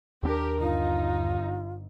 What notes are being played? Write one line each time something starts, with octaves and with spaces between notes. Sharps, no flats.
D#2 C4 D4 G4 A#4
G1 D#4 F4